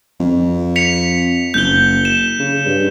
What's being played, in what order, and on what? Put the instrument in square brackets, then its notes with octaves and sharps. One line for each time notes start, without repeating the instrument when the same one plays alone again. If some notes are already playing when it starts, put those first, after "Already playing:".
[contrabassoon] F2
[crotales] B6 C#7 F7
[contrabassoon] F#1 [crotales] G6 G7
[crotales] E7
[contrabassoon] C#3
G2